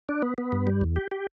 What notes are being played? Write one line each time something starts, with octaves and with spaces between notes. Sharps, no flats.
D4
B3
B3
G2
G3
E2
G4
G4